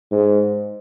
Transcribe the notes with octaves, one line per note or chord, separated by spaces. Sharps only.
G#2